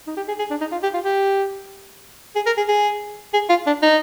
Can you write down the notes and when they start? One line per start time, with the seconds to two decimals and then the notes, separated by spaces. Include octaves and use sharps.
0.07 D#4
0.17 G4
0.28 G#4
0.39 G#4
0.50 D4
0.60 D#4
0.72 F4
0.83 G4
0.94 F4
1.04 G4
2.35 G#4
2.46 A#4
2.57 G#4
2.68 G#4
3.33 G#4
3.49 F4
3.66 D4
3.83 D#4